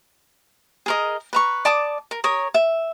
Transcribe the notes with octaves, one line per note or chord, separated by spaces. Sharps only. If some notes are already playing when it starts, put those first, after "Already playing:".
G#4 A#4 D#5
B4 A#5 C#6
D5 A5 D6 D#6
A#4
A#4 C#5 D#6
E5